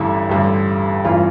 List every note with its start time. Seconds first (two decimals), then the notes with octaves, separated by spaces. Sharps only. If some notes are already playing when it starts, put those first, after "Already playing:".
Already playing: A1 G2 D3 E4
0.29 A1 G2 D3
1.04 A1 G2 E3 F4